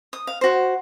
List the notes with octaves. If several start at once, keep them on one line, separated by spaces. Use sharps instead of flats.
D#6
F5
F#4 C5